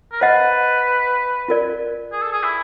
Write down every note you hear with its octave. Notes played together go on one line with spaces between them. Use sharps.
A#4
B4 C5 D#5 F#5
F4 A#4 D5
G#4
A4
G#4
E4